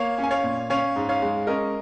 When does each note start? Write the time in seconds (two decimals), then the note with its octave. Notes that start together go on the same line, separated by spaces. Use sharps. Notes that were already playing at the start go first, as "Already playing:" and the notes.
Already playing: A#3 C#5 F5
0.18 C#4
0.24 G#5
0.31 C#5 F5
0.44 A#2
0.70 C#4 C#5 F5
0.96 G#2
1.09 C#5 F5
1.22 G#3
1.47 C#4 A#4 D#5